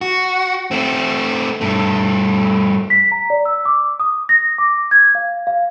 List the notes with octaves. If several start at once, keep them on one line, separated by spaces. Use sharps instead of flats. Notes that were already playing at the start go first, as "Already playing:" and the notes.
F#4
A3 C4
G2 A3
B6
A#5
D5
E6
D6
D#6
A#6
D6
G#6
F5
F5